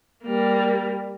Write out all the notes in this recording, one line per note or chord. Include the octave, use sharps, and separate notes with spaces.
G3 A#3